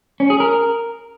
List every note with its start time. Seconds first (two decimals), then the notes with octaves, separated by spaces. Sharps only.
0.20 C#4
0.30 G#4
0.40 A#4